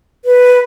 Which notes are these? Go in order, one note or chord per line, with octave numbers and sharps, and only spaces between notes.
B4